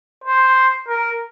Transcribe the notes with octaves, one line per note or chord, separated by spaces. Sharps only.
C5
A#4